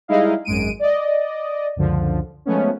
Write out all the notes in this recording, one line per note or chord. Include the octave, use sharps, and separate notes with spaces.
G3 G#3 D#4 E4 D#5 F5
G#1 F#2 G#3 D7 D#7
D5 D#5
C#2 F#2 D3 F3
F3 G#3 A3 B3 C#4